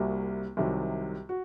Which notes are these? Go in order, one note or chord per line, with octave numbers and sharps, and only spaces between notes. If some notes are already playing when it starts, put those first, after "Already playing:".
Already playing: C2 C3 G3 A#3 F#4
C2 C3 D#3 F#3
F#4